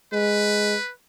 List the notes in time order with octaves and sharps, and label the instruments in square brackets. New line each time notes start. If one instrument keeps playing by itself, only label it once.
[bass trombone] G#3 [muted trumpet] B4